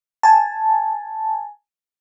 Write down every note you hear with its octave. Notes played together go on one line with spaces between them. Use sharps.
G#5 A5